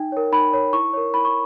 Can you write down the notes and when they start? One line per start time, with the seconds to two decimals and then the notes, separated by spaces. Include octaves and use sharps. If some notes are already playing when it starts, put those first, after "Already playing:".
Already playing: D#4 G5
0.12 A#4 C#5
0.32 D#4 B5
0.53 A#4 C#5
0.73 E4 C#6
0.94 A#4 C#5
1.14 E4 B5
1.25 C#6